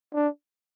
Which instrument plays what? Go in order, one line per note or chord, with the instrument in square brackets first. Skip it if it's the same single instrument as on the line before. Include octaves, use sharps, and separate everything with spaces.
[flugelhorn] D4